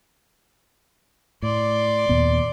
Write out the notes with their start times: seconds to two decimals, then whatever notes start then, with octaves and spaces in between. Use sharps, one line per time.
1.42 A2 D5 C6
2.09 D#2 A#2 B3